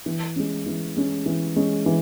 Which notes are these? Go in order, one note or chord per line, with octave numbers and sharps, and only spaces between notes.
E3
G#3 C#4
E3
G#3 C#4
E3
G#3 C#4
E3